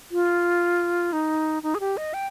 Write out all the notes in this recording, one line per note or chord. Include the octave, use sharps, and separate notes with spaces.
F4
D#4
D#4
G#4
G4
D#5
G5